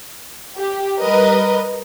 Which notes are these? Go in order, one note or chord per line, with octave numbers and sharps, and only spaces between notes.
G4
G3 A#4 B4 D#5